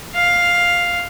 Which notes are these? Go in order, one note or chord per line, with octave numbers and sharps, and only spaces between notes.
F5